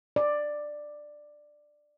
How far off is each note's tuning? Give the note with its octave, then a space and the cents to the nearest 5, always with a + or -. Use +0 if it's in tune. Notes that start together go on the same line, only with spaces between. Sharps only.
D5 +10